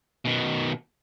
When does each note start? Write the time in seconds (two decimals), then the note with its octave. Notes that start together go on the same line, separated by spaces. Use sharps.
0.25 B2 D#3